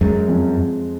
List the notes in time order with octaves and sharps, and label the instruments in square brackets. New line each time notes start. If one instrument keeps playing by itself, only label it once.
[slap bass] F#2 [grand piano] G#3
[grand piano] F2